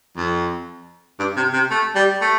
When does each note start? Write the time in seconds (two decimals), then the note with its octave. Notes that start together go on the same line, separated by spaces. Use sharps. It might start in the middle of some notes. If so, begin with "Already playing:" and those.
0.17 F2
1.19 G2
1.37 C3
1.53 C3
1.71 A3
1.95 G3
2.21 A3